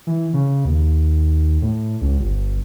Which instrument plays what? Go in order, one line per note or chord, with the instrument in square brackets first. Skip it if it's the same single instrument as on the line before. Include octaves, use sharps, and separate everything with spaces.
[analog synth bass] E3
C#3
D#2
A2
C#2
G1